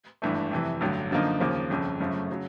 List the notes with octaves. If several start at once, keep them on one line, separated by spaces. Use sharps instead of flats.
G#1 G2 E3 A3
F2 C3 E3
A1 G2 D3 F#3
F#2 D3 F3 A#3 D#4
D#2 C#3 F3 A#3
G1 F2 C#3
G1 F#2 C#3 F3 A3
C#3 F#3